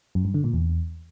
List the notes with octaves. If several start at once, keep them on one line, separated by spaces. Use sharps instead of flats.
F#2
G2
D3
A#2
E2